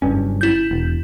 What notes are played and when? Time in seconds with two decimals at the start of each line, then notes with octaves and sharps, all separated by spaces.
0.02 F#1 G2 C#4
0.41 E4 G6
0.71 E1